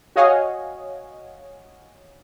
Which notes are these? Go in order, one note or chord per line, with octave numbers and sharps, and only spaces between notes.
F#4 C#5 D#5 F5 F#5 G#5